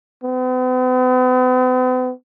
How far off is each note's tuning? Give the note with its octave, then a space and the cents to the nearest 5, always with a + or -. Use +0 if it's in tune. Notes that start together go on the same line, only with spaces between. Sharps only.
B3 +45